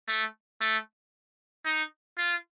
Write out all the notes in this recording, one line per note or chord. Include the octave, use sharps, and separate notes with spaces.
A3
A3
D#4
F4